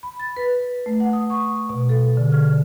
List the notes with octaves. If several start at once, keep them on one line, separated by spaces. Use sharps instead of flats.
B5
A6
B4
A3
F#5
D#6
C#6
B2
A4
D3
F6
D3